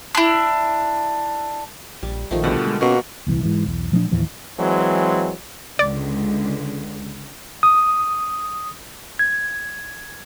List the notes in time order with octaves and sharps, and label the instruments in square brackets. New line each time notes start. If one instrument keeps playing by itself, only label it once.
[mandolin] D4 E4
[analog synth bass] A#1 [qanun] G3
[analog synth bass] A#1 [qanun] D#3 F3 A3
[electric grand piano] B2 D3 G3 [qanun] D5 F#5
[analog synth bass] G#3
[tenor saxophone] B2 [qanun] A#3 [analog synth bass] C#4 [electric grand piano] F#4
[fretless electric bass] D#1 C2 E3
G#2 E3
B1 E2
A#2 F3 A3 D4
D#2 A2 E3 F3
[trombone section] E3 F#3 G#3 C4
[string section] C#2 D3 [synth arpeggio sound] D5
[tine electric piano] D#6
G#6